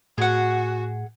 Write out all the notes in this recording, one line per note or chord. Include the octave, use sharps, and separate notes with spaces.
A2 F#4 G#4 F#5